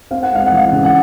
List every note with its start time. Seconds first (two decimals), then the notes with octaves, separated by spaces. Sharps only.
0.11 C4 F5
0.23 F#5
0.32 G#3 F5
0.46 F#5
0.52 E3
0.58 F5
0.72 C#3
0.85 F#5